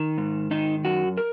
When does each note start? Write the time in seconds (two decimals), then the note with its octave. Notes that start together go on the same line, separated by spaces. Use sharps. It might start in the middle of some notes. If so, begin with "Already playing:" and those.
Already playing: D#3
0.18 G#2
0.51 D#3 D#4
0.85 F#2 F#4
1.18 A#4